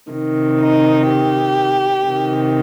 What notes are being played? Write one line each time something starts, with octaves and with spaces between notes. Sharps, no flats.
C3 D#3
D#4
G4
C3 D#3